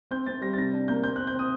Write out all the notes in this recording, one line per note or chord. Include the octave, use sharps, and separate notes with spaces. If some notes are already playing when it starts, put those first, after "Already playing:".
C4 G6
C4 A6
G3 A#6
A6
C3 A#6
D4
A#3 G6
C4 G6
C4 F#6
G6
C4 D#6